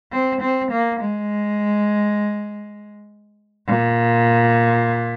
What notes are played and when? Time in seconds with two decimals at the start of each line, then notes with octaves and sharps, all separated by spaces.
0.12 C4
0.41 C4
0.71 A#3
1.00 G#3
3.67 A#2